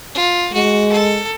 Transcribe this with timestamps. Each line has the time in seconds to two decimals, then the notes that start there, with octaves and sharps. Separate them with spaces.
0.14 F4
0.53 G#3 F#4
0.92 A4